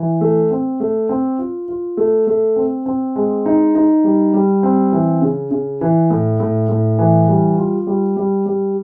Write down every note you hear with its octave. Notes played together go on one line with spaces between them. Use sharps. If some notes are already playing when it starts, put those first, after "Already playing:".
Already playing: E3
A3
C4
A3
C4
F4
F4
A3
A3
C4
C4
G#3
D#4
D#4
G3
G3
C4
E3
C#3
C#3
E3
A2
A2
A2
E3
G3
F4
G3
G3
G3